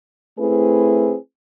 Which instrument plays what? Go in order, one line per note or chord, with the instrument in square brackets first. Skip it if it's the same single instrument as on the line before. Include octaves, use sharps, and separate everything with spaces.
[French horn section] A3 C4 E4 G#4 B4